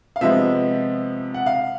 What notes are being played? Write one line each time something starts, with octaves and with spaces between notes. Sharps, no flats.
F5
C3 F3 G#3 B3 E5
F#5
F5